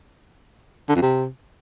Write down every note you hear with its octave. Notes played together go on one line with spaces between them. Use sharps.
D3
F2
C3